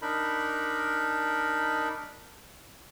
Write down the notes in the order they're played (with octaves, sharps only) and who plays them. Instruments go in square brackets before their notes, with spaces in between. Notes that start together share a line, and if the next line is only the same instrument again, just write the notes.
[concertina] D4 D#4 A#4 B5